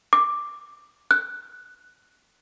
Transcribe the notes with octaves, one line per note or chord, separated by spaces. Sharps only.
D6
F#6